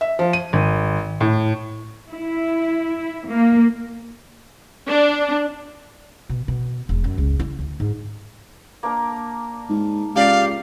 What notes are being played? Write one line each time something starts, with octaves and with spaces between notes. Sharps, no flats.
E5
F3
D#7
G#1
A2
E4
A#3
D4
B2
B2
E1
F#2
C#2
E4
D2
G#2
A#3 D4 A#4
G#2
C#2 G4 D5 F5